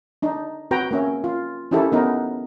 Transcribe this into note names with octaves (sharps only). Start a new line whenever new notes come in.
D4 D#4
C4 F#4 B4 G5 A#5
A#3 C#4 E5
F4
C#4 D#4 E4 G4 A4 A#4
B3 C#4 D#4 A#4 B4